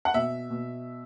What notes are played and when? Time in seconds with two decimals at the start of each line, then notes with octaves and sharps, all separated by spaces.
0.05 F#5
0.14 B2 E5
0.50 B2